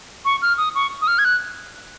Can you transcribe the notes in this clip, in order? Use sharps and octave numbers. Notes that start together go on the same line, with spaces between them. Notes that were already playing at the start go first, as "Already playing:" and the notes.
C#6
F6
D#6
C#6
D#6
F6
G#6
F#6